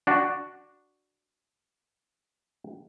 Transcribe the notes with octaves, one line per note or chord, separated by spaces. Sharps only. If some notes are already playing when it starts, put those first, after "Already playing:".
D4 F#4